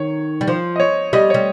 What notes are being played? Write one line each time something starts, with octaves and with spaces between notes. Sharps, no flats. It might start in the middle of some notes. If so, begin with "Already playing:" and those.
Already playing: D#3 C#5
G3
F3 C5
D#5
C#5
G3 D#5
G3 C#5